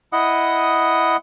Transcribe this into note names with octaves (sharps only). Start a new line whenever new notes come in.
E4 D#5 F#5 D#6